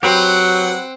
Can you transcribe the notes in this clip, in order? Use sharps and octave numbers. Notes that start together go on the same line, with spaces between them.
F#3 C4 G4 B4 C5 F#5